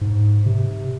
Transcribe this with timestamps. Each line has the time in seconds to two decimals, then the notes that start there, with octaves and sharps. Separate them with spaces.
0.01 G#2
0.46 C3